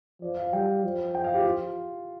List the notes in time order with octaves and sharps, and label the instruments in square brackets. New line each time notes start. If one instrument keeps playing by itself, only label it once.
[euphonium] F3 [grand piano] D5
[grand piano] F5
[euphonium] G3 [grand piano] G5
[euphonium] F3
[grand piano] G5
F5
G4
F4